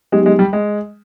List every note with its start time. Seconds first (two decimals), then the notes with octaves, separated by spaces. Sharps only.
0.12 F#3 G#3 B3 D#4 G4
0.26 G#3
0.39 G3
0.53 G#3